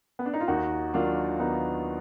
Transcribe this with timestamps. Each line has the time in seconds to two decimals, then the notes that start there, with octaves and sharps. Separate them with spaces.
0.19 B3
0.25 D4
0.34 D#4
0.40 F4
0.48 D#2 D#4 F#4
0.94 D#3 F#3 A#3 D4 F4
1.39 D#2 B3 D#4